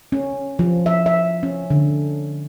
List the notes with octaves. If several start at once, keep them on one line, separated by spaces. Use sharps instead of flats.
C#4
F3
E5
E5
C#4
D3